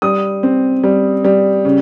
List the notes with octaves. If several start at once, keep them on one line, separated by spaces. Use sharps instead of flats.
G3 D#6
C4
G3
G3
C#3